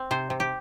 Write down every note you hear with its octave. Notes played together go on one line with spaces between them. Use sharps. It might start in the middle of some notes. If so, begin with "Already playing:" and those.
Already playing: C4
C3 C5
C3
G4